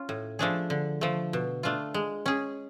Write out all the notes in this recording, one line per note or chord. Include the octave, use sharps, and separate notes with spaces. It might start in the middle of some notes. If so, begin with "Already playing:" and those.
Already playing: C#4 F4
A2
F3 A3 D4 G#4
D3
F3 A3
B2
A3 D4 F4
G#3
C#4 G#4